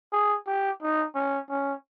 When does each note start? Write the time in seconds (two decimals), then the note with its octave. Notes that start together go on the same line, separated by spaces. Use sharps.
0.12 G#4
0.47 G4
0.82 D#4
1.15 C#4
1.49 C#4